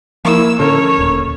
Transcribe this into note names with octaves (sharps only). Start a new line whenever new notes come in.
F3 A#3 E4 E6
A2 D3 C#4 A4 A#4 C#5
D#1